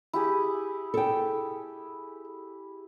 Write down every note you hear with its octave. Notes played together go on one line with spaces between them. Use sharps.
E4 G4 G#4
A4 G5